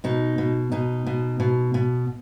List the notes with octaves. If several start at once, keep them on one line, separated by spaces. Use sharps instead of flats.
B2 D#4
B2
B2 D#4
B2
B2
B2